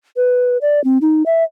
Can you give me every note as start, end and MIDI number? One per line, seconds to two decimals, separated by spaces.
0.16 0.58 71
0.61 0.82 74
0.84 0.98 60
1.02 1.23 63
1.26 1.44 76